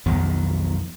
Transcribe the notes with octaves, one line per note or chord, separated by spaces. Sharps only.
B1 F2 D#3 B3